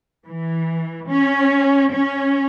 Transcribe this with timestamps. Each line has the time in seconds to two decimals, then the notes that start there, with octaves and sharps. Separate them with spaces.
0.26 E3
1.10 C#4
1.92 C#4